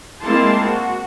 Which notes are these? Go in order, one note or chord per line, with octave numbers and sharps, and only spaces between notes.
G#3 A#3 C4 E4 A5 C6
F#4